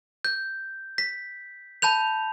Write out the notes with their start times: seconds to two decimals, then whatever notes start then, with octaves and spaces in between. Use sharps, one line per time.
0.25 G6
0.98 B6
1.82 A5 B5 G6 F7